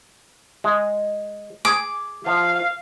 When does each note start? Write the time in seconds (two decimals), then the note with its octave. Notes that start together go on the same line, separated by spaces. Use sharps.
0.64 G#3
1.65 G#4 D6
2.26 F3 F5